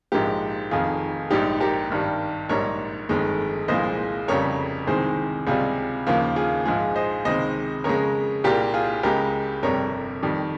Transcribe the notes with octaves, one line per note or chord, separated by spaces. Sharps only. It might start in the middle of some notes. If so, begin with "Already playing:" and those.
A#1 G#2 F3 G#3 G4 A#4
F1 F2 D#3 F4 G#4
A#1 G#2 G3 D#4 G4
G4 A#4
G#1 G2 D#3 G3
A#1 G#2 G3 A#4 C#5
G1 F2 D#3 G#3
C2 A#2 F3 G#3 C5 D#5
F1 F2 C#3 G3 A#4 C#5
C2 C3 D#3 G#3 G#4 C5
C#2 C3 G3 F4 G#4
D#2 C#3 F3 A#3
F4 G#4
A#1 G#2 F3 G#3 F4 G#4
C5 D#5
C#2 C3 D#3 G#3 C5 D#5
F2 C#3 G#3 A#4 C#5
C2 A#2 G3 G4 A#4
F4 G#4
C#2 C#3 G#3 G4 A#4
G1 F2 C3 G3 A#4 C#5
F2 D#3 G3